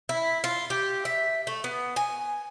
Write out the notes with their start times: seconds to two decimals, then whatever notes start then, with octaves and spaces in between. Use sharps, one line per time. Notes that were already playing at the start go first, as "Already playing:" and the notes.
0.09 E4
0.44 F4
0.70 G4
1.05 E5
1.47 A3
1.64 B3
1.96 G#5